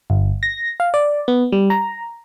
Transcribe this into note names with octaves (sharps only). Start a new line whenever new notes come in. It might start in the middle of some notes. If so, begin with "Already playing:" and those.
G1
A#6
F5
D5
B3
G3
A#5